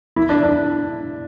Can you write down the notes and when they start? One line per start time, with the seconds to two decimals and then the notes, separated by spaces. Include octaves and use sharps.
0.16 E4
0.29 D4
0.43 D4